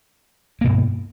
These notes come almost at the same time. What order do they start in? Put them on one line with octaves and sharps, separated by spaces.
A#3 B2 G2